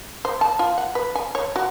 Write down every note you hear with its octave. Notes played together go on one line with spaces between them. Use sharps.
C5
A5
F4
F#5
B4
G#5
C#5
F#4